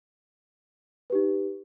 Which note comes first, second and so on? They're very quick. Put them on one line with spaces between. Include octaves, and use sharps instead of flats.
B4 G4 D#4